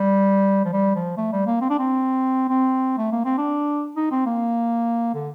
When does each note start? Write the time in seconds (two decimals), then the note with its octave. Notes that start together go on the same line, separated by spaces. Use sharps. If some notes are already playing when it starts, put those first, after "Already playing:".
Already playing: G3
0.65 F3
0.73 G3
0.95 F3
1.17 A3
1.32 G3
1.46 A#3
1.61 C4
1.70 D4
1.79 C4
2.49 C4
2.98 A3
3.12 A#3
3.24 C4
3.38 D4
3.97 D#4
4.11 C4
4.26 A#3
5.14 D3